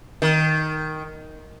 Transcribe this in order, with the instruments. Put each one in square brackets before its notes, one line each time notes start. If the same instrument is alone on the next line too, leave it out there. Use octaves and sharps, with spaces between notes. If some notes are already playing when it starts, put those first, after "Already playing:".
[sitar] D#3